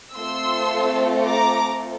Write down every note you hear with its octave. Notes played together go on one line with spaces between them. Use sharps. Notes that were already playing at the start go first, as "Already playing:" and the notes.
A3 C4 F4 A4 C6 E6
A#5 D6